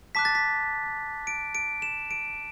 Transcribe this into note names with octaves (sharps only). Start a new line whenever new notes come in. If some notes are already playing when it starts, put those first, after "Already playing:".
A5 D6 F#6 B6
A6
B6
D7
D7
E7
D7